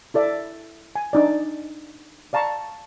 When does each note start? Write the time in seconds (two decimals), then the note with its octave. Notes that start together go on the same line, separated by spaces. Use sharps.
0.14 E4 A4 D5 E5
0.96 G#5
1.13 D4 D#4 D5
2.33 D5 F5 A5 A#5 C#6